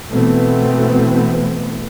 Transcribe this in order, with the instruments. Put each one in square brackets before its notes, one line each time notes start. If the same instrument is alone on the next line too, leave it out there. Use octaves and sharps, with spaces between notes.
[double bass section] B2 E3 A3 B3 C4